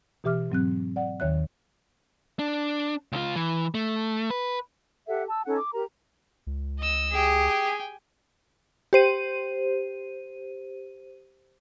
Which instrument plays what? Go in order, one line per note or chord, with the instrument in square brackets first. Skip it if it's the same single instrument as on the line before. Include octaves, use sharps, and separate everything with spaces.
[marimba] B2 E3 G4 E5 D6 F6
G#2 F#3 C4 F#6
D5 F#5
D#2 D#3 C#5 E5 F#6
[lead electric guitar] D4
C#2 F4
E3
A3
B4
[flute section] G4 A4 E5 F#5
A5 E6
C#4 D#4 A4 F#5
D6
G4 A#4 A#5
[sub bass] C#2
[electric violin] D#5 E6
[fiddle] G4 [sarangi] G#4
[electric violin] G5 G#5
[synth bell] G4 C5 D#7